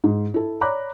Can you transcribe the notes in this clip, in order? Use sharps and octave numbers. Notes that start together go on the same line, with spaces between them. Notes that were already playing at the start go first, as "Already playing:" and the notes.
G#2
E4 A4
C#5 D5 A#5 B5 D6 F#6